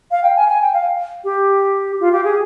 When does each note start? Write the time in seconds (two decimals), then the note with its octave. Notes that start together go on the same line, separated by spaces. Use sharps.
0.11 F5
0.23 G5
0.36 G#5
0.48 G#5
0.62 G5
0.74 F5
1.24 G4
2.00 F4
2.12 G4
2.24 G#4